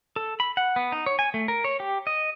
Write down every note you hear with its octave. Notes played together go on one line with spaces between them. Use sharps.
A4
B5
F#5
B3
D#4
C#5
G#5
A3
A#4
C#5
G4
D#5